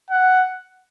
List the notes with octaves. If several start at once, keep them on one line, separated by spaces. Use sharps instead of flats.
F#5